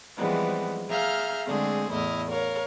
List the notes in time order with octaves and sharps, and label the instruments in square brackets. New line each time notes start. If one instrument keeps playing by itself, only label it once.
[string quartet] E3 F3 G3 G#3 B3 C4
G#4 E5 F5 A#5 F6 G6
D3 G#3 A3 C4 G#4
E2 A2 E4 D#5 F6
A#4 C#5 F5